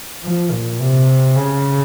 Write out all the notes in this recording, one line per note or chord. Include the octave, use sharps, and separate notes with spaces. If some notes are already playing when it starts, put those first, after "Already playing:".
F3
A#2
C3
C#3